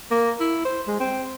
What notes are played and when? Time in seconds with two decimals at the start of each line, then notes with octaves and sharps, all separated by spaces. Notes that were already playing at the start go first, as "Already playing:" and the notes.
0.11 A#3
0.40 E4
0.65 C5
0.88 G#3
1.00 C4